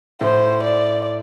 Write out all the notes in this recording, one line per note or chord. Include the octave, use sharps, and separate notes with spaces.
A2 C5
D5